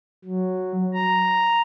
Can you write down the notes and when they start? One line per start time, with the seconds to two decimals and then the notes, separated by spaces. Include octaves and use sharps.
0.24 F#3
0.94 A#5